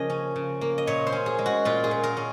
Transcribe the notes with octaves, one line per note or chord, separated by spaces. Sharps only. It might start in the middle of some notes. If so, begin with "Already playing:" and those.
Already playing: C#3 F3 A#3 D#5 G#5
C#4
C#3
A#3
D#5
A#2 C#5
C5
C#4
G#4
G#3
F#4
A#2 F4
G#4
A#2
A#4
C#4